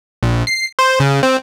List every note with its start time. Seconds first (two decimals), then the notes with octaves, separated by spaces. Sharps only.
0.23 A#1
0.47 C7
0.79 C5
1.00 C#3
1.23 C4